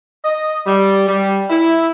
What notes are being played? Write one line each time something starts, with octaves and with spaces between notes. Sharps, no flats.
D#5
G3
G3
E4